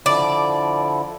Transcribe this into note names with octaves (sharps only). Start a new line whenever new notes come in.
D3 F3 E4 D5